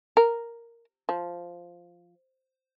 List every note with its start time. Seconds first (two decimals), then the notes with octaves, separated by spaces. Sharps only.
0.17 A#4
1.09 F3